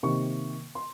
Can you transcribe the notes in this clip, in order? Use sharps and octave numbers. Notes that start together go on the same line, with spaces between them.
C3 D#3 A#3 C#6
C6